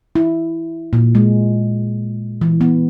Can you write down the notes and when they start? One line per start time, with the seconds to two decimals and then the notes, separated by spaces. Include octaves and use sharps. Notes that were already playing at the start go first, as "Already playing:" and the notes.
0.16 E4
0.93 A#2
1.15 G#3
2.41 E3
2.61 B3